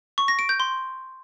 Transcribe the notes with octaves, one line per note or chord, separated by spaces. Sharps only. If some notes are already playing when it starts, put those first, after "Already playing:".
C#6
A#6
D7
G6
C6